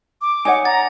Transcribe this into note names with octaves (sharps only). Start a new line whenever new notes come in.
D6
D#4 C#5 F#5 G#5
A#5 A6